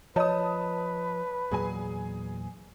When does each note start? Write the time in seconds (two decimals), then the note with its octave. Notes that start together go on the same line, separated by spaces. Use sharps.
0.16 F3 B4 C#5 D#5 A5 D#6
1.51 E2 A#2 F#3 G#4 G#5